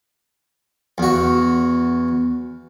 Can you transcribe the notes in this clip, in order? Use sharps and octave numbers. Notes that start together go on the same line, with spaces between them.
E2 F#4